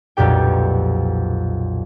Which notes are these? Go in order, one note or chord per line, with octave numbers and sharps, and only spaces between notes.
B1 F2 A#2 G4 G5